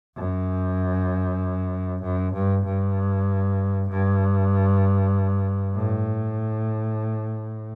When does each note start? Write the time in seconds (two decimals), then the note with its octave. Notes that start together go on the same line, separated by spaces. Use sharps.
0.17 F#2
2.03 F#2
2.34 G2
2.65 G2
3.89 G2
5.75 A2